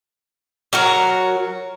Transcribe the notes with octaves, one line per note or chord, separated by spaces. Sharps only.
F#3 F#4 A#4